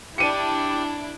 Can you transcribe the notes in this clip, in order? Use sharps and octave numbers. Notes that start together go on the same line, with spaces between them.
D4 E4 G4 C#7 D#7